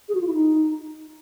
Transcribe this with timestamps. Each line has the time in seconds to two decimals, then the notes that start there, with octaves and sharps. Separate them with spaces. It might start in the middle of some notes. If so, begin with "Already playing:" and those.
0.09 G#4
0.15 F#4
0.21 F4
0.27 E4
0.33 D#4